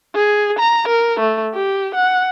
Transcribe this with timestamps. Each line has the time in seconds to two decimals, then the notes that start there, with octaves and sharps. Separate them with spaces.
0.15 G#4
0.59 A#5
0.87 A#4
1.19 A3
1.54 G4
1.95 F#5